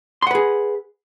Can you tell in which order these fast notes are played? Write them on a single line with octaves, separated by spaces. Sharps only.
C6 F#5 B4 G#4